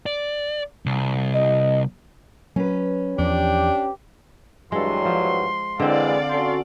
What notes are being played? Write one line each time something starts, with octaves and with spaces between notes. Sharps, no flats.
D5
C2
D#5
F#3 C#4 B4
E2 F3 D4 G4
G2 E3 F#3 G#3 A4 C6
F3
D3 E3 G#3 C4 D5 F5
C#4 F#4 A4 C6